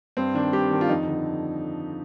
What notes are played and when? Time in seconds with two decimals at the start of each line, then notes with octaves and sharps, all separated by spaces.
0.17 G2 C4
0.34 D#3 D4
0.53 G2 G4
0.71 D#3
0.81 F4
0.89 F2 D#4
1.07 D3